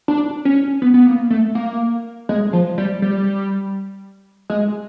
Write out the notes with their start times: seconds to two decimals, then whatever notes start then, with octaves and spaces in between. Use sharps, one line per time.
0.08 D4
0.45 C#4
0.82 B3
0.94 B3
1.06 A#3
1.30 A3
1.55 A#3
2.29 G#3
2.53 F3
2.78 G3
3.02 G3
4.50 G#3